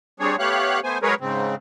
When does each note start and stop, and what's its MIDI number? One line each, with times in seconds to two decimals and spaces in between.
0.20 0.36 55
0.20 0.36 60
0.20 0.36 62
0.20 0.36 68
0.20 0.36 73
0.39 0.80 57
0.39 0.80 59
0.39 0.80 67
0.39 0.80 73
0.39 0.80 77
0.39 0.80 90
0.84 0.98 57
0.84 0.98 59
0.84 0.98 72
0.84 0.98 80
1.02 1.14 54
1.02 1.14 56
1.02 1.14 68
1.02 1.14 70
1.02 1.14 71
1.02 1.14 73
1.21 1.55 44
1.21 1.55 49
1.21 1.55 60